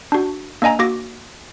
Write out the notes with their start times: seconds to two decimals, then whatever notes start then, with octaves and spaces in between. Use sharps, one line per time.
0.12 D4 F#4
0.62 A#3 D4 D#5 G#5 A#5
0.79 A#3 F#4 D6 A#6